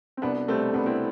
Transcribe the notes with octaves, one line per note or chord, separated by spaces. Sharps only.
C4
C2 B3 D4
B2 G3 A3 C4
C2 B3 D4
C4 E4